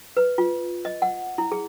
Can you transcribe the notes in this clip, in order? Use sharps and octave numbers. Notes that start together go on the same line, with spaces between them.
B4
F4
D#5
F#5
E4
G#4